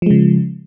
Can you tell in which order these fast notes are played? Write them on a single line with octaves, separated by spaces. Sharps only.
F3 G#3 C#3